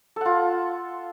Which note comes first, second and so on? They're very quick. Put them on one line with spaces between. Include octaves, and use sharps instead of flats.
A4 F#5 F4